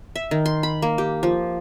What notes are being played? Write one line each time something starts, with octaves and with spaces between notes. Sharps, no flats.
E5
D#3
C6
B5
A#3
G4
F3